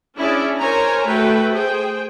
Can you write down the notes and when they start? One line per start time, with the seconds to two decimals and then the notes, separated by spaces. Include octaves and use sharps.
0.17 C#4 D4 E4 G#4 D5
0.59 A#4 C5 C#5 G#5 A#5
1.07 A3 F#4 B4 G5
1.52 G#4 C5 G5